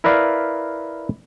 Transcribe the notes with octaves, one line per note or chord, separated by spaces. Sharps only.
E4 A#4 B4 D5 F5